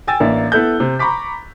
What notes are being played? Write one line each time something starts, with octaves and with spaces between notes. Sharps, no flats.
G5 G#5 E6 A6
A1 A#3 D4 E5
B3 E4 A4 F#6 G6
C3
A#5 B5 C#6 D6 B6